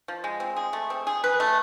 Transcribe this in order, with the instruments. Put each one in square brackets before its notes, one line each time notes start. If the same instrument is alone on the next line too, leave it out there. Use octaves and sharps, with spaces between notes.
[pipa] F3
G#3
C4
G#4
A3
C4
G#4
B4
A3